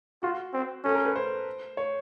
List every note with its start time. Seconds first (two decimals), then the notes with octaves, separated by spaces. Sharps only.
0.23 F4 F#4
0.54 C4
0.84 C#4 A4
0.94 A#4
1.06 B4
1.16 C5
1.77 C#5